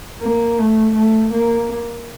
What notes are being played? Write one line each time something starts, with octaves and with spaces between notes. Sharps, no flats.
A#3
A3
A3
A#3